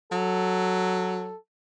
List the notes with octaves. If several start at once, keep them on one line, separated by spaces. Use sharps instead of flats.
F#3 A4